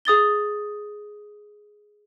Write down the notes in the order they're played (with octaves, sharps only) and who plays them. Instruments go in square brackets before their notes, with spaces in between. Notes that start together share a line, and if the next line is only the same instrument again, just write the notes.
[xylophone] G#4 D#6 A6 G7